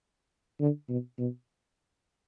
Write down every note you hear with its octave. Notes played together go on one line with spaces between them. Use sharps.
D3
B2
B2